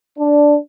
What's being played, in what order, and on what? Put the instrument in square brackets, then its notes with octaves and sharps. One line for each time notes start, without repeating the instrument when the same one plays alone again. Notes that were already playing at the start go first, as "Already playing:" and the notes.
[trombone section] D4